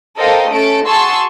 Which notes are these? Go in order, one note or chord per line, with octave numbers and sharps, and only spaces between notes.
A4 A#4 C5 D#5 F5 G5
A3 C#4 A4 A5 D7
F#4 G#4 A5 C6 C#6 E6